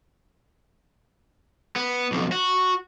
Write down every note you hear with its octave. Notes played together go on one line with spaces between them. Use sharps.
B3
B1 F2
F#4